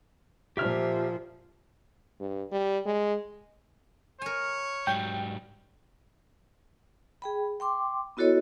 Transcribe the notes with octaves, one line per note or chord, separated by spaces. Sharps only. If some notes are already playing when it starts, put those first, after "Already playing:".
A#2 F3 G4 E5 F6
G2
G3
G#3
A#4 C#5 G#5
G#2 F#3 G3 G5
G#4 G5 B5
G5 C6 D6
B3 E4 F#4 A4 C#5 D#5